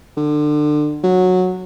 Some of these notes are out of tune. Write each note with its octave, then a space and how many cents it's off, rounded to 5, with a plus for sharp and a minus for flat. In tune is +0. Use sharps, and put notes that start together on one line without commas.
D3 +30
F#3 -10